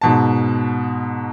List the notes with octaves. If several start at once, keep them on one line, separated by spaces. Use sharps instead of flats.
G#2 B2 A5